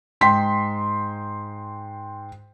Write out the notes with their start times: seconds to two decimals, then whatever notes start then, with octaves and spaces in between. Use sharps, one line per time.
0.21 G#2 G5 C6 B6